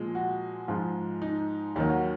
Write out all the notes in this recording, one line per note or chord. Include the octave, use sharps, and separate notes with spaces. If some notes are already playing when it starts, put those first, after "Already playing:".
Already playing: A#2 F3 G#3
F#4
G#2 F3 G#3 F4
D#4
D#2 D#3 F#3 D#4
F#4